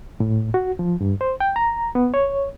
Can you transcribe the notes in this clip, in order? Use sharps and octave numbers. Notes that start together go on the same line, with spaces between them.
A2
F#4
F3
G2
C5
G5
A#5
B3
C#5